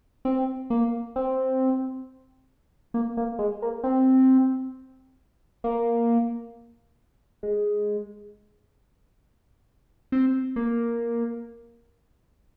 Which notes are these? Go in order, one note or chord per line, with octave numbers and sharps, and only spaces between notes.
C4
A#3
C4
A#3
A#3
G#3
A#3
C4
A#3
G#3
C4
A#3